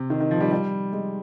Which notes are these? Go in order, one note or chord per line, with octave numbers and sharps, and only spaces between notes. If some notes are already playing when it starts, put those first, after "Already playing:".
Already playing: C3
D#3
D#3
F3
G3
G3
G#3